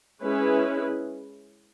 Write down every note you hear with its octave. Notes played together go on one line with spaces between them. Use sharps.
G#3 C#4 E4 G#4 B4